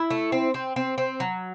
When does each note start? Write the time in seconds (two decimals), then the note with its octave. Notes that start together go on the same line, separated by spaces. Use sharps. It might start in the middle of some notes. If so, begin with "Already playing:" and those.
Already playing: E4 E5
0.10 A3
0.32 C4
0.54 C4
0.76 C4
0.98 C4
1.20 F#3